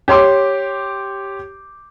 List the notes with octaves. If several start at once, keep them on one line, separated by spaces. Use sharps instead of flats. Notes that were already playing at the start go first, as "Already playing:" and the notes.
G4 C#5 C6 D6